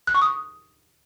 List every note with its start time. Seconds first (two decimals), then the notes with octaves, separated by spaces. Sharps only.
0.07 F#6
0.15 C#6
0.22 D#6